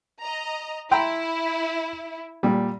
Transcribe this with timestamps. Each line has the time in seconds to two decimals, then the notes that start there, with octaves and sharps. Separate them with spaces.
0.20 D#5 A#5
0.91 E4 G5 A#5 C6
2.43 A#2 G3